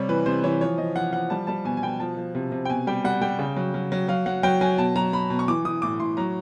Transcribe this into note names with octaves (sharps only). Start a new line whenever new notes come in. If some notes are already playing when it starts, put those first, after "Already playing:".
Already playing: C3 G3 C#5
E3 B4
C3 C5
E3 C#5
F3 C#5
F3 D#5
F3 F#5
F3 F#5
G3 A5
G3 A5
B2 G#5
G#5
B2 G5
F3 A5
F3
C3
C3
G5
B2 G#5
G3 G5
G3 F#5
G3 G5
C#3
F#3
F#3
F#3
F#3 F5
F#3 F#5
F#3 G5
F#3 G#5
B2 A5
F#3 A#5
F#3 B5
B2
C#6
E3 D6
E3 D#6
A2 D6
A2 C6
F#3 A#5